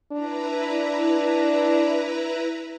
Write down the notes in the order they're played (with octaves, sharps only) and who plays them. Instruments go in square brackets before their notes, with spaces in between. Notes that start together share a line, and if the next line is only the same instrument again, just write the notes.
[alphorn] D4 [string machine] E4 B4 A#5